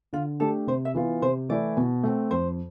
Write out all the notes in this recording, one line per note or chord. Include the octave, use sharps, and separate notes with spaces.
D3 F4
A3 D4 G4 A4
C3 C5
E5
E3 B3 F4
C3 C5
E3 A3 E4 D5
B2
A3 C4
F2 C5